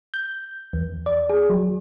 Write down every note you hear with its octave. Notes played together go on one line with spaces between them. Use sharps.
G6
E2
D5
G#4
F#3